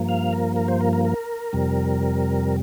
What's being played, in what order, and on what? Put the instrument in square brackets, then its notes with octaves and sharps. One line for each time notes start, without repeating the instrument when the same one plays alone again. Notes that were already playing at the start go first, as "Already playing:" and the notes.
Already playing: [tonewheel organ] G2 F3 A#3
F5
A#4
A#4
C5
A#4
A#4
A#4
F2 C3 G3